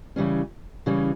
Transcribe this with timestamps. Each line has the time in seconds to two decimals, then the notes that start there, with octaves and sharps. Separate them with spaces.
0.16 C#3 E3 G3 C#4
0.86 C#3 E3 G3 C#4